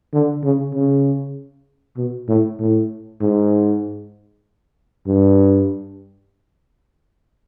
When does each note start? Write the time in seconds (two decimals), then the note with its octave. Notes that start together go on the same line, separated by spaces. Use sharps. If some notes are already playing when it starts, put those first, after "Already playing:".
0.13 D3
0.44 C#3
0.74 C#3
1.97 B2
2.28 A2
2.60 A2
3.21 G#2
5.07 G2